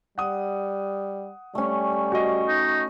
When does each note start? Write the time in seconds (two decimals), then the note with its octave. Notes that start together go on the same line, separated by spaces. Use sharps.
0.18 G3 F#5 D#6
1.55 G3 A3 C#4
2.12 F#4 D#5
2.48 D#4